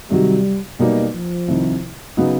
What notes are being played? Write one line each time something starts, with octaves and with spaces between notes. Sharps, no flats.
C3 D#3 F#3 G3
B2 F#3 G3 A#3 D#4
F3
C2 C3 D#3
C#3 F#3 B3 D#4